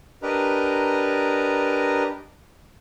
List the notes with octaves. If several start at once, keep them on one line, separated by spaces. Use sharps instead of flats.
D4 G4 A#4 B4 D#5 A#5